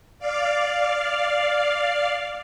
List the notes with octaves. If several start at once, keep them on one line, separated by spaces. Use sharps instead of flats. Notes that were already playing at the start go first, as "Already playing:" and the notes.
D5 F5